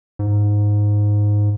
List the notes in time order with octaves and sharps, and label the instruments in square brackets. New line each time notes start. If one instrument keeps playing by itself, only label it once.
[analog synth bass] G#2